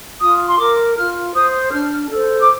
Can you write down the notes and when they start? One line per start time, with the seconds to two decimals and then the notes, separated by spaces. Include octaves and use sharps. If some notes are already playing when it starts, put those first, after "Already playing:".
0.20 F4 D#6
0.47 C6
0.58 A#4 D6
0.96 F4 F6
1.34 C5 D#6
1.71 D4 F6
2.09 A4 C5
2.39 D6